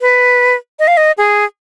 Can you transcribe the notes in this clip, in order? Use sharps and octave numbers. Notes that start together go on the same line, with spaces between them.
B4
D#5
F5
D#5
G#4